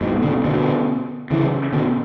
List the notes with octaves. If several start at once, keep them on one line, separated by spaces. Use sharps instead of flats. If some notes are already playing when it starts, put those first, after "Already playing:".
G#2 B2
B2 D3
B2 D3
C#3 E3
B2 D3